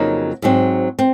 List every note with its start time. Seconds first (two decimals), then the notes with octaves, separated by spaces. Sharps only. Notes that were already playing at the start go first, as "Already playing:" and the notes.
Already playing: F2 C#3 F#3 A#3 D#4
0.42 G#2 F#3 C4
0.99 C4